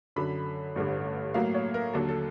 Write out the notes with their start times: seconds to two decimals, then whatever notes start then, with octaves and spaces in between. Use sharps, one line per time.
0.16 F#2 D3 F#3 B5
0.76 A1 G2 D3
1.34 A2 F#3 A#3 F5
1.54 C#5
1.74 A#4
1.93 D#2 D3 F#3 A4
2.09 A4